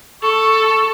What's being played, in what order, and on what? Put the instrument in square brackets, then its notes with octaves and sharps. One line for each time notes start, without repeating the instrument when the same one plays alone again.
[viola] A4 [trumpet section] C#6